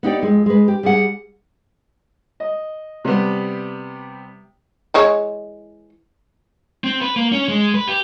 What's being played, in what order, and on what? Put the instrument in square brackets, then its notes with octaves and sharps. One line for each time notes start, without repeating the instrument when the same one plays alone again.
[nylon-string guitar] B3 D#4 G4 D5
F2 G#3
G#3 B4
G4
G3 G#4 F#5
[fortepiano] D#5
C3 G3 B3
[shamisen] E3 G#3 C#5
[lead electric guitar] C4
B4
A#3
C#4
G#3
B4
G4